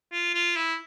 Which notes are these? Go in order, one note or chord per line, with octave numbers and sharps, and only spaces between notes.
F4
F4
E4